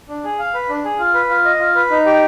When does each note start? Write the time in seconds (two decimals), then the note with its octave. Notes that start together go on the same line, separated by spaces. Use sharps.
0.09 D4
0.24 G#4
0.39 F5
0.54 B4
0.69 D4
0.85 G#4
0.99 F4
1.14 B4
1.29 F4
1.45 D#5
1.59 F4
1.75 B4
1.90 D#4
2.06 G4